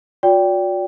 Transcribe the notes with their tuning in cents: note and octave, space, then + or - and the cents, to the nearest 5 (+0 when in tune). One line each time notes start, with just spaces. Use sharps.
F#4 -45 D5 -30 G5 +0